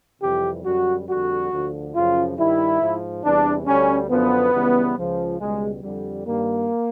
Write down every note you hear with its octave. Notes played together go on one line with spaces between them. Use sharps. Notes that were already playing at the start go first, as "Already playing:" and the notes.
F2 C3 E3 G3 G4
F#2 D3 G3 F#4
F2 D3 G3 F#4
D2 D3 F3
F#2 C#3 F3 F4
G2 D#3 G3 E4
G#2 F3
E2 C3 E3 G3 D4
D2 D3 G3 C#4
F#2 D3 F3 B3
C#2 C#3 E3 G3
C#2 C#3 F3
C#2 B2 G3 G#3
F2 D3 G3
G2 D#3 G3 A#3